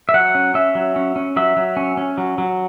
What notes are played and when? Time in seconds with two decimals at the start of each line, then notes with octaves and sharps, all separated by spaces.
0.09 E5
0.14 F#3 F#5
0.35 C#4
0.54 C#4 E5
0.75 F#3
0.96 C#4
1.16 C#4
1.37 F#3 E5
1.57 F#3
1.77 C#4
1.97 C#4
2.18 F#3
2.38 F#3